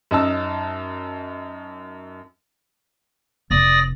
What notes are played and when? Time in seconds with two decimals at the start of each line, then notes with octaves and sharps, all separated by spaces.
0.11 F#2 D#4 A5 E6
3.51 F1 D5 D#6 A#6